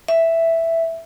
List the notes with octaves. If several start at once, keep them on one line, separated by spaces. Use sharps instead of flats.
E5